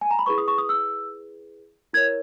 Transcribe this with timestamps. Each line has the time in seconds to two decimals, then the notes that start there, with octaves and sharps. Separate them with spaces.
0.01 G#5
0.11 A#5
0.19 B5
0.26 E4 G#4 B4 C#6
0.38 D#6
0.48 C#6
0.58 D#6
0.69 E6
1.93 E4 A#4 C#5 G#6